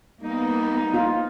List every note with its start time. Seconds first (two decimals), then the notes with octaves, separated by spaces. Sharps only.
0.23 G3 A#3 B3 D#4
0.94 F4